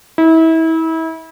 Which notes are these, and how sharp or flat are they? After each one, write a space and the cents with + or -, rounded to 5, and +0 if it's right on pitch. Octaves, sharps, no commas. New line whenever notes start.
E4 -30